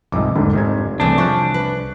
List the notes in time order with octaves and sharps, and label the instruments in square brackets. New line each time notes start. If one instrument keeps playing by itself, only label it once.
[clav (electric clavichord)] C2 F2 G#2 [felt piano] D#5 D6
[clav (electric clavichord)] D#2 [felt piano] G#2 D3
[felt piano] F1 G#6 [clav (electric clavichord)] G#2 C3 D#3
[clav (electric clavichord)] C2 C#3 G#4 [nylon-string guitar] E3 A3 C4 [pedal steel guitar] D4
[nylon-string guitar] F3 E5 [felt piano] C#6 F#6
[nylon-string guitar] B4